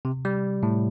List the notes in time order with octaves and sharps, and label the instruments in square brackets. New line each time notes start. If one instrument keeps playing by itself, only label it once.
[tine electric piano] C3
G3
A2